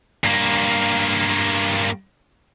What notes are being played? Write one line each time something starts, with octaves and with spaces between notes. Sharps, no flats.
G2 A#3